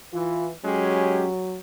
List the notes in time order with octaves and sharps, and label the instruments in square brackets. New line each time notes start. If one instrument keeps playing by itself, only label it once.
[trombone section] E3 [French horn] F4
[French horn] F#3 [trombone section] G#3 C#4 G4